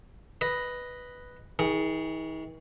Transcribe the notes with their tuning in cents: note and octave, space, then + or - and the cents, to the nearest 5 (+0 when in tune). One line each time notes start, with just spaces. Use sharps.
B4 +0 D#5 +0
D#3 +45 G#4 +0